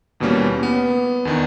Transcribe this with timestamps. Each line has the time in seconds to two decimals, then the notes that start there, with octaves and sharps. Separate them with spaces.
0.20 D#2 B2 E3 G3 A#3 C#4
0.63 B3
1.25 E2 D#3 D4